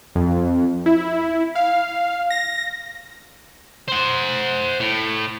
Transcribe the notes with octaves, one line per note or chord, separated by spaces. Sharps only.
F2
E4
F5
A#6
C5 F#5
A2